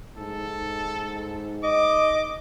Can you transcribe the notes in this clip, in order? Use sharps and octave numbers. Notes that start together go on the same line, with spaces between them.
G#2 A4
D#5 D6